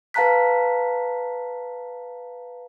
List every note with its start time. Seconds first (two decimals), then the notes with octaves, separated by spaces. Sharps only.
0.14 B4 F5 A5 A#5 F#6 B6